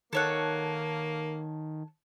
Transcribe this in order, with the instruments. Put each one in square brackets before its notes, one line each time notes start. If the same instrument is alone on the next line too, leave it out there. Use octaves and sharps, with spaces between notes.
[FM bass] D#3 [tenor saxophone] A#3 [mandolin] A4 C#5 F#5